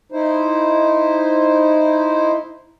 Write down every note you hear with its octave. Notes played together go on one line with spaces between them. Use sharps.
D#4 E4 C5